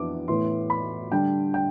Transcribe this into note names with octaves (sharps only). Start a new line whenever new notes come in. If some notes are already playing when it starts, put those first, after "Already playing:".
Already playing: F2 E3 B3 D4 D6
A2 E3 B3 C6
B5
D3 G3 D4 G5
G5